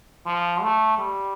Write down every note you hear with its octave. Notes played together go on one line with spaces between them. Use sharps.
F3
A3
G3